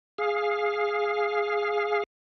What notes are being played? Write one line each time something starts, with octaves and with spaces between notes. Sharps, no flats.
G#4 F5